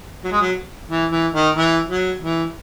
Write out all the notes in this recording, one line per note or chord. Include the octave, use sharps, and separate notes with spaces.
F#3
G#3
F#3
E3
E3
D#3
E3
F#3
E3